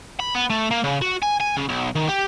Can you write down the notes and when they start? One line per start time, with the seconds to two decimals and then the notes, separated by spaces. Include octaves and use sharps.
0.20 B5
0.35 B3
0.50 A3
0.71 A#3
0.84 C#3
1.02 F#4
1.23 G#5
1.41 G#5
1.57 C#3
1.69 B1
1.95 D#3
2.09 G4